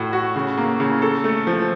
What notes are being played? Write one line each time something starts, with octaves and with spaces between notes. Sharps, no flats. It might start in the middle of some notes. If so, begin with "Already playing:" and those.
Already playing: A2 F#4
F#4
C#3
A#3
C#3
A4
A3
F3